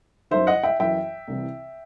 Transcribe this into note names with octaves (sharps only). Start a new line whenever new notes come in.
F#2 D#3 C5 E5
D#5 F#5
E5 G5
F#2 E3 E5 G5
C2 C3 E3